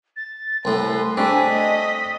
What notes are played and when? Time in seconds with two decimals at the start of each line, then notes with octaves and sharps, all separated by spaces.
0.16 A6
0.65 C2 A2 B4 C6
1.17 A3 C4 D4 G#5 B6
1.50 D#5